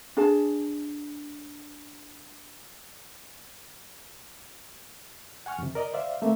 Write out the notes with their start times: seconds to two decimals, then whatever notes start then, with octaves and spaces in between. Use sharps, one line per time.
0.17 D4 G#4 A5
5.46 F#5 G#5 C#6 F6
5.58 F2 C3
5.75 A#4 D5 D#5
5.93 C5 D5 E5 F5
6.22 A3 A#3 C4 E5